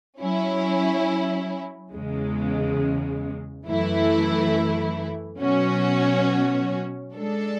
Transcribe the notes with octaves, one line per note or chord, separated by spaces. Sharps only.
F#3 C#4 E4
E2 C#3 G#3
F#2 E3 A3 E4
B2 F#3 C#4 F#4 C#5
G#3 D4 A4